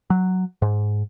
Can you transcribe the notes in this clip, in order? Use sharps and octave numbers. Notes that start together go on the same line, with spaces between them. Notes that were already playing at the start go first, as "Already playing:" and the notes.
F#3
G#2